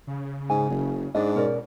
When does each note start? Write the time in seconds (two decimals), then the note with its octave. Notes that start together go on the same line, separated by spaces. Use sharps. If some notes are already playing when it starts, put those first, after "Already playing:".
0.07 C#3
0.50 G#2 G#5
0.70 F#1
1.15 G#2 D4 D5 D#5
1.36 B2 C#4 A#4 D5